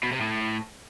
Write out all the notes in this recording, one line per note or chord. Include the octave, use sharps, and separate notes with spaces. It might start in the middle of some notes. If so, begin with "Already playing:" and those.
B2
C3
A2